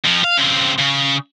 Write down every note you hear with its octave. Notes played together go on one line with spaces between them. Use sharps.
F2 F3
F5
C#3 C4
C#3